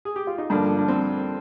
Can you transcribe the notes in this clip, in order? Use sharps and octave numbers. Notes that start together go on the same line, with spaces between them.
G#4
G4
F4
D#4
G2 D3 F3 A#3 D4
D4
C4